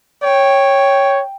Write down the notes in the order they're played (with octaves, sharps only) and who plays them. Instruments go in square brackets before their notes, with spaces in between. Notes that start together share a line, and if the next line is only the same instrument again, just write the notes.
[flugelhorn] C#5 [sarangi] G5